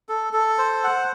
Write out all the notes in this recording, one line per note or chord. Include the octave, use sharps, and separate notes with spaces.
A4
A4
C5
F#5